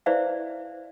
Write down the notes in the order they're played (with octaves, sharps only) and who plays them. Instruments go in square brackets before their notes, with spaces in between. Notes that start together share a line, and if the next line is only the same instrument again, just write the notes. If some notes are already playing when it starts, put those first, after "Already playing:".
[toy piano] E4 B4 C5 D5 E5 F5